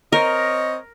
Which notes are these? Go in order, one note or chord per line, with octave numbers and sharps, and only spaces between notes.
C4 A#4 C#5 D#5